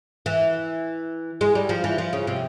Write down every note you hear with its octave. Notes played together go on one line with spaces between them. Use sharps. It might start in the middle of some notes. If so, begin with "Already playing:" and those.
E3
G#3
G3
F3
E3
F3
C#3
C3